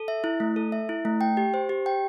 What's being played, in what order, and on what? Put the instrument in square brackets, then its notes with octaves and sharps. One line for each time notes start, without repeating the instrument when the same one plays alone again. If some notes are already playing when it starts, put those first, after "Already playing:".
Already playing: [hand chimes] A4
E5
E4
A3
A4
E5
E4
A3
G5
G4
C5
G4
G5